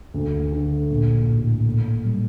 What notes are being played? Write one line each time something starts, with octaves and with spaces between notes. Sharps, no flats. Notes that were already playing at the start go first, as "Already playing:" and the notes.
D2
D3
A#1
A2
A#2
G3